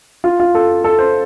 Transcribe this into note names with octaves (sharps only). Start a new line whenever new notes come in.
F4
F4
A4
A4
C5